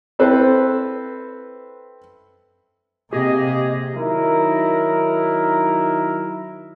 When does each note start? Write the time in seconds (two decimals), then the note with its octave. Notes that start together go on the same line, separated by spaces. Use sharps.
0.19 C4 E4 A4 B4 C5
3.13 C3 A#3 G4 G#4 D#5
3.94 D#3 F#3 D#4 E4 A#4